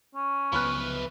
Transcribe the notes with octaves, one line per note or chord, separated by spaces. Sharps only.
C#4
C#2 F3 F#3 B3 B4 B5 F6 F#6